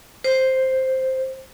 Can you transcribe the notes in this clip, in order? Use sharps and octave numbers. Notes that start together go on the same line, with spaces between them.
C5